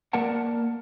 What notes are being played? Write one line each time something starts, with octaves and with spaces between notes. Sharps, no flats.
A#3 A#4 D5 F#5 A5